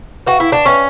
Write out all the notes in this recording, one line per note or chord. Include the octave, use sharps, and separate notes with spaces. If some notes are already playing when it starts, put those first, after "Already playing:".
F#4 B4 E5 G5 C#6
E4
D4
C#4 B4 E5 G5 C#6